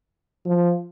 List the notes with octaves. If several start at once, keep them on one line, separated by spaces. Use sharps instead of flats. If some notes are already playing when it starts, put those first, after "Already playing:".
F3